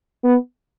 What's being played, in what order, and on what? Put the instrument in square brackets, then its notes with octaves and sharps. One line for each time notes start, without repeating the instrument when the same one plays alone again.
[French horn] B3